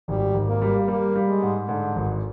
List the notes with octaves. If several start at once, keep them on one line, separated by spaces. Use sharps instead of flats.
G#1 G3
G#1
A#3
G3
G3 A#3
G3
G#3
G#2
G#2 D3
G#1